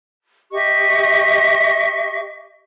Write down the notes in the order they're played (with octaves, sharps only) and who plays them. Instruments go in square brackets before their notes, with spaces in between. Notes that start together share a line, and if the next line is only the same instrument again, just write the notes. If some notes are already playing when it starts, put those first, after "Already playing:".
[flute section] G4 D#5 E5 C#6